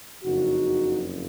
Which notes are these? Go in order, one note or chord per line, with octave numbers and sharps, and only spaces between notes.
F#1 F2 C#3 D#4 F#4